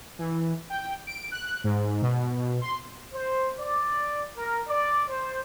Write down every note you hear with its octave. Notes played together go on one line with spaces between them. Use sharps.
E3
G5
D7
F#6
G#2
B2
C6
C5
D5
A#4
D5
C5